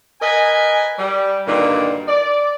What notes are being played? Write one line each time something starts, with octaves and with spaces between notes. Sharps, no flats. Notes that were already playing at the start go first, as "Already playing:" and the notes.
A#4 B4 D#5 G#5
G3
G2 A#2 D3 D#3 F#3 G3
D5